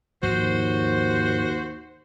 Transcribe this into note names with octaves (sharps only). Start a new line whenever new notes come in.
D#2 G#2 F3 F#4 C5